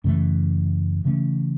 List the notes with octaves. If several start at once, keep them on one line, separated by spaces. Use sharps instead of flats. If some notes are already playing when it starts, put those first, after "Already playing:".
F#2 C#3 E3 A3
C#3 E3 A3 C#4